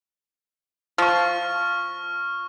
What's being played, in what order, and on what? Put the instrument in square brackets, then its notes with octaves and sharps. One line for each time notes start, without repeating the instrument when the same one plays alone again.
[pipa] F3 [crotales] C#6 F6